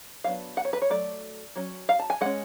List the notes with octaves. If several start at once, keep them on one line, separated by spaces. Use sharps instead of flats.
F#3 B3 D4 F5
F#5
C#5
B4
C#5
F#3 A3 D5
F#3 C#4
F5
A5
G#5
G#3 C#4 F#5